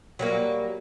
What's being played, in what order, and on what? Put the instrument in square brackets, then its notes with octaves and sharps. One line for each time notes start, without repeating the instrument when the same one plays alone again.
[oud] F#3 G3 A#3